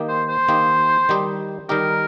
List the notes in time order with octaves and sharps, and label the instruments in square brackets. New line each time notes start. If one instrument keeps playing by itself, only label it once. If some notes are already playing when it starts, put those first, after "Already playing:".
Already playing: [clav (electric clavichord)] D#3 A#3 D#4 G4
[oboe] C5
C5
[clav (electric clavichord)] D#3 A#3 D#4 G4
D#3 G3 D#4 G4
[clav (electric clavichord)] D#3 G3 D#4 G4 [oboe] A#4